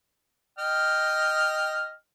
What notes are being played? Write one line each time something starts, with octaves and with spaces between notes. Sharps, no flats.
D#5 G5 F6